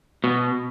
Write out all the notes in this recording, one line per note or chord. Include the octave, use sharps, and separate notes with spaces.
B2